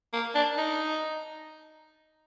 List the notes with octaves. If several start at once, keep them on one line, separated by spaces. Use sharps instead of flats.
A#3
D4
D#4